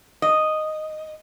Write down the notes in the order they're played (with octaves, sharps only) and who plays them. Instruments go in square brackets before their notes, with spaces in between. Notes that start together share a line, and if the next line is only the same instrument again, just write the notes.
[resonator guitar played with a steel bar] D#5